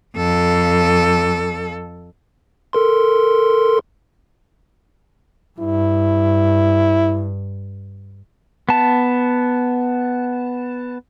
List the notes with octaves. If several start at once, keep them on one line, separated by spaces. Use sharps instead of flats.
F2 A4
A4 A#4 C6
G2 E4
B3 A5